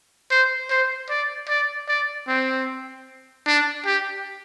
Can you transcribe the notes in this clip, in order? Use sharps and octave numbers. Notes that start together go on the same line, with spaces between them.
C5
C5
D5
D5
D5
C4
D4
G4